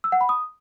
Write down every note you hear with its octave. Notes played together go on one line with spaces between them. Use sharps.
E6
F#5
B5
D#6